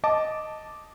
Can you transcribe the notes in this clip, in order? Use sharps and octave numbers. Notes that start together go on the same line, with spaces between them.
D#5 A5 D6